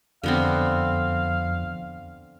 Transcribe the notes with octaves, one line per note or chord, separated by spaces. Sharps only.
F2 D3 B3 C4 F5